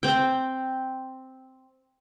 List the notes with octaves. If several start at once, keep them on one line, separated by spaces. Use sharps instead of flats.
C4 G5